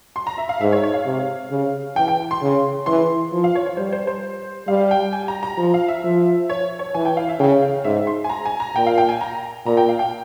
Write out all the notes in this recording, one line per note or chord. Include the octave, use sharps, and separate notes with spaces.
C6
A#5
E5
F5
G#2 E5
C#5
C#5
F5
C3
C#3
E3 G5
G5
C6
C#3
E3 C6
F3
F5
C#5
C#5
G3 C5
C5
C5
G3 F5
G5
G#5
A#5
A#5
F3
F5
E5
F3
C#5
C#5
E3 G#5
G5
F5
E5
C#3 G5
F5
G#2 E5
C6
G#5
A#5
G#5
A#5
A#2 G5
F5
G5
G#5
A#5
A#2 A#5
G5
F5
G5